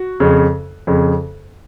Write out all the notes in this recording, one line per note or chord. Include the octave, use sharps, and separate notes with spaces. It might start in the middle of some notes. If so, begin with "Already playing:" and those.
Already playing: F#4
F2 C#3
F2 C#3